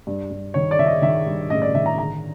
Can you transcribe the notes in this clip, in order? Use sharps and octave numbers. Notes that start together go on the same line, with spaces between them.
G2
G2
D#3 C#5
D5
D#3 E5
D#5
D#3 E5
G2
A1 D#5
D5
D#3 E5
A#5
D3 A#5